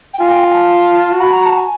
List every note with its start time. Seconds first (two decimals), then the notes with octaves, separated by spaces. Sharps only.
0.14 G5
0.19 F4 G#5
0.31 G5
0.43 G#5
0.54 A5
1.12 F#4
1.20 B5
1.33 A#5
1.46 A5
1.57 G#5